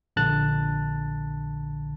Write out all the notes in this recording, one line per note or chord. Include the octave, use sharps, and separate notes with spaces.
A#1 D3 A5 F#6 A6